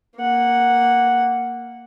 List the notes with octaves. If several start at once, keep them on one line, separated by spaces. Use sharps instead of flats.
A#3 F#5